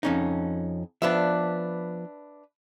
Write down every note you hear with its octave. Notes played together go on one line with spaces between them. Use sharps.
F2 C#4 D#4
F3 B3 D4 B4 E5